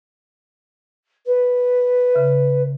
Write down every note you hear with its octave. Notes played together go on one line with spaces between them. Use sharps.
B4
C#3 E5